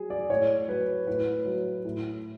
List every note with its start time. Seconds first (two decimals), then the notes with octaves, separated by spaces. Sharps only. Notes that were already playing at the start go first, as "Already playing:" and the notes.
Already playing: F#3 G#4
0.10 D5
0.30 A2 C#5
0.68 F#3 B4
1.07 A2 B4
1.45 F#3
1.85 A2